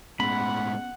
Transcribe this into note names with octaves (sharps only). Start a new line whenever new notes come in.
A2 G#3 B3 C#4 F#5 B5